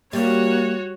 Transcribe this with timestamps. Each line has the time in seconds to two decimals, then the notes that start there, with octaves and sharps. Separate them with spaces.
0.13 G3 A#3 F#4 C#5